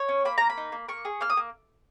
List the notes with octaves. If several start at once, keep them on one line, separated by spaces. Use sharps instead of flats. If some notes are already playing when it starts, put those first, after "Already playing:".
Already playing: C#5
C#4
A#3 B5
A#3 A#5
B5
D#4
A#3
A#3 C#6
G#4
A#3 F6
D#6
A#3